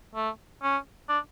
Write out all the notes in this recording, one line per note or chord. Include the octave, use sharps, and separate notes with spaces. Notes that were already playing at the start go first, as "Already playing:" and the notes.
A3
C#4
D4